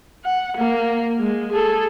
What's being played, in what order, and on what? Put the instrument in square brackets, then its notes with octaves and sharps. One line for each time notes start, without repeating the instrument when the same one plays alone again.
[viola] F#5
A#3
G#3
G#4 A4